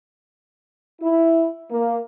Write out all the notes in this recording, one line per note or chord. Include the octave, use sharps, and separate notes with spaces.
E4
A#3